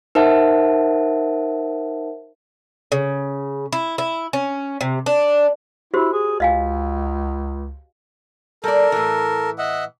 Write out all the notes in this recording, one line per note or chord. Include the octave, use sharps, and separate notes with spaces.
D#4 A#4 C5 E5 F#5 A5
C#3
E4
E4
C#4
C3
D4
E4 F#4 G4 C5
G#4
C#2 D#5 F5 G#5
G3 A4 A#4 D5
A2 E3
D#5 E5 F#5